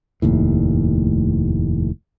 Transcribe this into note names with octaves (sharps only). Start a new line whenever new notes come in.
F1 D#2 A2